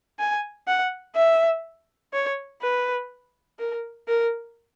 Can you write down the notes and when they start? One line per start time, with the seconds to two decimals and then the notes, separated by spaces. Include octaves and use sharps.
0.19 G#5
0.67 F#5
1.16 E5
2.13 C#5
2.62 B4
3.59 A#4
4.08 A#4